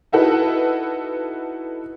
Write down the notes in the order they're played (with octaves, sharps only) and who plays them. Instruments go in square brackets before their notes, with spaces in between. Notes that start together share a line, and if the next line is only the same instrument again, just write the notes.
[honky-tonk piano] D#4 E4 F#4 A4 B4